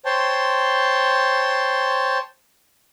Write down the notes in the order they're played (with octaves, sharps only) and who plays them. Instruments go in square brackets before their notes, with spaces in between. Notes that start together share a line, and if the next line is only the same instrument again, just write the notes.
[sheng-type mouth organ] C5 C#5 G5 A5 C6